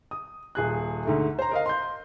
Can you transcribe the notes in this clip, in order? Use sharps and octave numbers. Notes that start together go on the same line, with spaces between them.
D#6
D#1 G#4 F#6
D2 G#2 A3
C5 A#5
A#4 D#5 F5
C6 G6